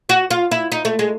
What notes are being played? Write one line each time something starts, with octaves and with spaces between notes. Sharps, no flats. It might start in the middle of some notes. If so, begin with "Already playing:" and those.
F#4
F4
E4
D#4
A3
G#3